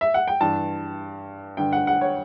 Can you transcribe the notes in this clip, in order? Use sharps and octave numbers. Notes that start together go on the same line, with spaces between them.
E5
F#5
G5
G2 E3 A5
G2 D3 G5
F#5
F#5
C#5